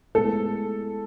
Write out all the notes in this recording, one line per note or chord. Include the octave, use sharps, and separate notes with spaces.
A2 G#3 B3 E4 A4